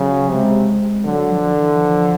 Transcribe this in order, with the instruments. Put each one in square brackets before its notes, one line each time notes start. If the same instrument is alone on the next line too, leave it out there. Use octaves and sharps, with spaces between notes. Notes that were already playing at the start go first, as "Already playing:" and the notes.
Already playing: [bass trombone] C#3 [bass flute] F#3
[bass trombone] C3 [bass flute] G#3
[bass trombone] D3 [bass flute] F#3
[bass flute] F3
E3
F3